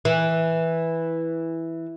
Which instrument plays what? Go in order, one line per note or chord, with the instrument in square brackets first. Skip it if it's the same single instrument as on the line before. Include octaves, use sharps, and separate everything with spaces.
[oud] E3